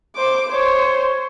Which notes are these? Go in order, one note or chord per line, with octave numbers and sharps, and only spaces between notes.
C5 D6
C5 C#5